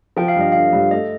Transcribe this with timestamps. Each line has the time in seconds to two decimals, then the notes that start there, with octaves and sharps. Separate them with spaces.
0.16 F3 G5
0.28 F5
0.36 G2 D#5
0.52 D3 F5
0.73 G2
0.91 A3 D#5